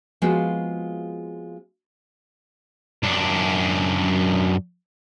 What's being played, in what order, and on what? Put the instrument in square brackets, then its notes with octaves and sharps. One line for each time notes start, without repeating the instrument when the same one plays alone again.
[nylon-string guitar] F3 G#3 B3 C4 F4 F#4
[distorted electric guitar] F#2 D4